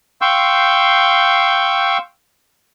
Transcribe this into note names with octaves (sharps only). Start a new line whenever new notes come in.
F5 G5 C6 C#6 E6 G6